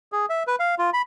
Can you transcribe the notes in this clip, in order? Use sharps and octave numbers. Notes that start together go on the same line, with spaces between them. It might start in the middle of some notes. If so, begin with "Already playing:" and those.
G#4
E5
B4
F5
F4
B5